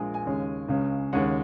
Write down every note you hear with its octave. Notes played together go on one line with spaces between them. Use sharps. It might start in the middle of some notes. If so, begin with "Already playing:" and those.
Already playing: A#1 A#2 G#3 G#5
G#5
D#2 C#3 G#3 C#4
C#2 C#3 G#3 C#4
D#2 C#3 G#3 C#4 F#5